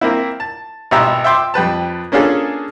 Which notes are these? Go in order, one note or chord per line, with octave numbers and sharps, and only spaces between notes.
A#3 C4 E4
A5
G#1 B2 G4 E5 A#5
E5 G5 C6 D6
F2 G4 B4 A5
A#3 C#4 D4 F4 G#4 A4